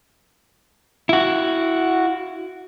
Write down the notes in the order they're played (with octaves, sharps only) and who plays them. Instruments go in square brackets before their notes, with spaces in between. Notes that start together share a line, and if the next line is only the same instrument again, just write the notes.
[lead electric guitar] E4 F#4